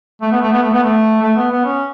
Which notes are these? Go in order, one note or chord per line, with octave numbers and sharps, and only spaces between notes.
A3
B3
A3
B3
A3
B3
A3
A3
B3
B3
C#4